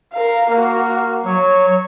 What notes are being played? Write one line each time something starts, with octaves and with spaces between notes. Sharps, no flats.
A#4 F5
A#3 F#4 A#4
F#3 C#5